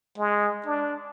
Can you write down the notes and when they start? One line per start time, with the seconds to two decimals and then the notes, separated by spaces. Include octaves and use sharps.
0.18 G#3
0.66 D4